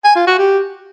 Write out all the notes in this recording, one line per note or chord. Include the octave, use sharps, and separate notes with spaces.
G#5
F4
F#4
G4